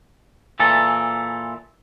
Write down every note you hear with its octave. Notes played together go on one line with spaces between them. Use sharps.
A#2 E3 A4